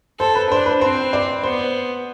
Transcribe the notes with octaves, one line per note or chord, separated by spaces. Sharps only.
A4 C5
B4
D4 C5
B4
C4 C5
D5
B3 C5